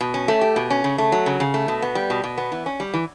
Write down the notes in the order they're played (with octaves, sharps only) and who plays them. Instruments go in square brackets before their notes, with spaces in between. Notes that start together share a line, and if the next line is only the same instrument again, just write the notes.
[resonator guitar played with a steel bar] B2
C#4
A3
G4
B2
C#4
C#3
A3
F#3
C#3
C#3
A3
B2
B3
G3
B2
B2
B3
E3
C#4
G3
E3